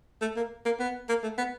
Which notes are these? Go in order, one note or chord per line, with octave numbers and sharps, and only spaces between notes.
A3
A#3
A#3
B3
A#3
A3
B3